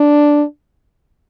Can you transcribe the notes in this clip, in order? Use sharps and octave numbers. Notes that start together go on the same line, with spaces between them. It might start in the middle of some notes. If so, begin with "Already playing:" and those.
Already playing: D4